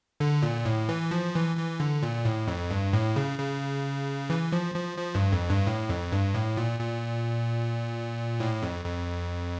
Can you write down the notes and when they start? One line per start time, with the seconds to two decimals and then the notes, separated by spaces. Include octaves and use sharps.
0.20 D3
0.43 A#2
0.65 A2
0.89 E3
1.11 F3
1.35 E3
1.57 E3
1.80 D3
2.03 A#2
2.25 A2
2.48 F2
2.71 G2
2.93 A2
3.16 C#3
3.39 C#3
4.30 E3
4.52 F3
4.75 F3
4.98 F3
5.15 G2
5.33 F2
5.50 G2
5.67 A2
5.89 F2
6.12 G2
6.34 A2
6.57 A#2
6.80 A#2
8.40 A2
8.62 F2
8.85 F2